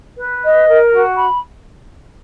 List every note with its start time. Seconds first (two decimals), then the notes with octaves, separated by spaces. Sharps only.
0.17 B4
0.42 D#5
0.67 A#4
0.92 F#4
1.17 B5